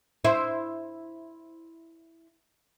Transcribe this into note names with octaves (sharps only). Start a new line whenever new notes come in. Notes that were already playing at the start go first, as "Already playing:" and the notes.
E4 C5